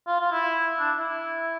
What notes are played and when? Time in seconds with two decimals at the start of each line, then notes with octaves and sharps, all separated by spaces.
0.07 F4
0.20 F4
0.31 E4
0.79 D4
0.98 E4